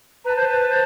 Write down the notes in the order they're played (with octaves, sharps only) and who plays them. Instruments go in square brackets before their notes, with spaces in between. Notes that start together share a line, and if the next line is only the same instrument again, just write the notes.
[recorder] B4 [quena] A5 A#5
[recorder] C5
B4
C5